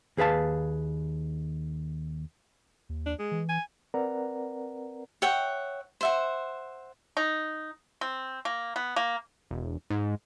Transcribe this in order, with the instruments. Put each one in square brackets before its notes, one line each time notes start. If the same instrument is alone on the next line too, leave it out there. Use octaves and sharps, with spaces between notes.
[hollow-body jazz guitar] D#2 G#4 B4 F5 A5
[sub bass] D#2
[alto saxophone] D4
G#3
[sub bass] E3
[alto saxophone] G#5
[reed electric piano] C4 A#4 B4 D5 F#5 A#5
[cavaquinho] C#5 E5 F#5 G5
C5 E5 F#5
[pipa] D#4
C4
A#3
B3
A#3
[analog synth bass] E1
G#2